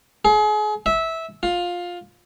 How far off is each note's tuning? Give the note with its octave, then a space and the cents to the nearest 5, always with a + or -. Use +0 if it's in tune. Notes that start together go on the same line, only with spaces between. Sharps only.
G#4 +35
E5 -15
F4 +15